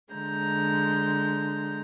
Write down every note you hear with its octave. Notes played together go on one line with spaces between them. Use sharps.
D3 G#3 A#5 G6